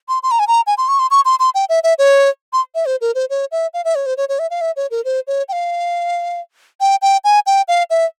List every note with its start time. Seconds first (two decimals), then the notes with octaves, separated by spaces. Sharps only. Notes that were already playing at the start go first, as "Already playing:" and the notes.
0.09 C6
0.23 C6
0.31 A#5
0.39 G#5
0.48 A#5
0.67 G#5
0.78 C6
0.88 C#6
0.99 C6
1.11 C#6
1.25 C6
1.40 C6
1.55 G5
1.69 E5
1.84 E5
1.99 C#5
2.53 C6
2.75 E5
2.86 C5
3.01 A#4
3.15 C5
3.30 C#5
3.52 E5
3.74 F5
3.85 E5
3.95 C#5
4.06 C5
4.17 C#5
4.29 C#5
4.39 E5
4.50 F5
4.61 E5
4.76 C#5
4.91 A#4
5.05 C5
5.27 C#5
5.49 G5
5.53 F5
6.81 G5
7.02 G5
7.24 G#5
7.46 G5
7.68 F5
7.90 E5